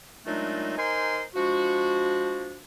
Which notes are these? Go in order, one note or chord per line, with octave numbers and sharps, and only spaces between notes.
A#2 F#3 G#3 A3 D4 D#4
D#4 A#4 C5 G#5 C6
F3 G#3 D4 F#4